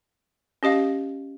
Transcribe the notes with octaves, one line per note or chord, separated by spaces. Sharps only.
C#4 G4 D#5 F5